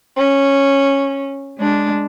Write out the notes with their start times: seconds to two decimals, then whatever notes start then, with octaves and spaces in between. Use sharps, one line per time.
0.18 C#4
1.58 G#3 D4